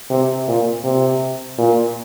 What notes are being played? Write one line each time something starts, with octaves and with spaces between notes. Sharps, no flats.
C3
A#2
C3
A#2